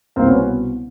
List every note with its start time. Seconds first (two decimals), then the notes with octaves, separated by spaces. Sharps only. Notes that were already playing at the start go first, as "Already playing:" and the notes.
0.16 C2 B2 A#3 C4
0.29 B3 C#4